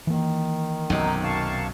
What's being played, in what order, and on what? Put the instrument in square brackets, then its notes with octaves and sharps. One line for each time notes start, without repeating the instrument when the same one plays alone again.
[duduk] D#3 [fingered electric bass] E3 A#3
[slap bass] B1 F#2 C3 [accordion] D#4
[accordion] F5 A5 C#6